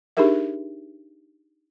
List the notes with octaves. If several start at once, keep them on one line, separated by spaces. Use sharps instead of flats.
D4 D#4 G4 G#4 A#4 E5